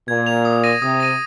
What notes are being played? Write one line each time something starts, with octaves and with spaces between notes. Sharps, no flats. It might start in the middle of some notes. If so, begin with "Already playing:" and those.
A#2 G#6
F7
D#6
A#6 D#7
C3 D#6
A#6 D#7